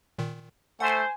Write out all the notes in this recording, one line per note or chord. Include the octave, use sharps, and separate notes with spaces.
A#2 D#3
A3 C5 F#5 G#5